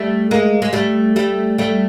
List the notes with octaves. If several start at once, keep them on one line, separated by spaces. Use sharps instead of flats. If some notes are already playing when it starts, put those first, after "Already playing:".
Already playing: G3 A3
G#3 A#3
G#3
G3 A3
G3 A3
G3 A3